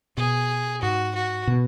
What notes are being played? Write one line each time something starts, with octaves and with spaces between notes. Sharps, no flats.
B2 G#4
G#2 F#4
F#4
B2